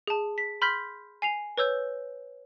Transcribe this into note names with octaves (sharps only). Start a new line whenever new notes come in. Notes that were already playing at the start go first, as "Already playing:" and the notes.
G#4 A5
B6
B5 C6 F6 G6 B6
G#5 C7 F7
B4 C#5 E6 G6